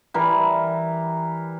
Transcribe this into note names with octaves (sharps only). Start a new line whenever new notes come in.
E3 G3 A#4